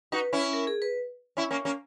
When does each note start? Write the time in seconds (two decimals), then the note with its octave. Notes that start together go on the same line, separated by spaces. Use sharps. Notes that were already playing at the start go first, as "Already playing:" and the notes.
0.12 D#4 F#4 B4
0.33 C#4 E4
0.53 A#4
0.67 G#4
0.82 B4
1.37 C#4 E4
1.51 A#3 C#4
1.65 A#3 C#4